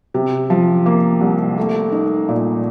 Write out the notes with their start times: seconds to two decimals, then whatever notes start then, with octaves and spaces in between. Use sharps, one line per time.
0.14 C3
0.50 F3
0.86 A#3
1.21 C2
1.58 A3
1.92 D#4
2.28 A#2